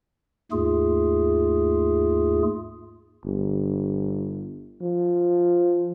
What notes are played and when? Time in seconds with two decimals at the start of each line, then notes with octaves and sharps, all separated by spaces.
0.52 D#2 G#2 A3 F4 G#4
3.25 G1
4.82 F3